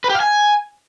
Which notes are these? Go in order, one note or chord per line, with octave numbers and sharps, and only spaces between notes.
B4
G4
F5
G#5